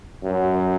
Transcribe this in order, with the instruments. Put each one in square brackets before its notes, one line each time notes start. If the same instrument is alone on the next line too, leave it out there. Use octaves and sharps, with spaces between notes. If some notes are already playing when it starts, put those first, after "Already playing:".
[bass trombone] F#2